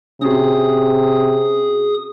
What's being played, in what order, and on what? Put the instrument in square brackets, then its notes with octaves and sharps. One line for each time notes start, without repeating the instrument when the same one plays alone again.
[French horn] C3 [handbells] C#4 F#4 [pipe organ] G#4 D#6